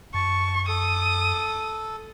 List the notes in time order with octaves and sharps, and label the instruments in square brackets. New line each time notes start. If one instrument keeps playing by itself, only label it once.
[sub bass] F#2 [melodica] A5 [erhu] C#6
[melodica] A4 [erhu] D#6